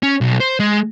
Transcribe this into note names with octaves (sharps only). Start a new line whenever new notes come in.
C#4
B1
C5
G#3